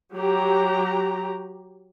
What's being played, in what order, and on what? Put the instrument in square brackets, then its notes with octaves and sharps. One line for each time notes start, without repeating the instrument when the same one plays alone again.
[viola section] F#3 G4 A#5